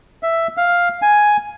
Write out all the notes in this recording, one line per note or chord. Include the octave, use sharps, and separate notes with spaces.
E5
F5
G#5